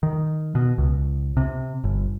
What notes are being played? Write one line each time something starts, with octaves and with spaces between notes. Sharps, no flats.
D#3
B2
C#2
C3
G1